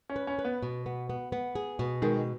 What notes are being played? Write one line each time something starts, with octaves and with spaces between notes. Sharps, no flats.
C#4
B4
C#4
B4
B3
B2
B3
B3
B3
G#4
B2
D#3 G#3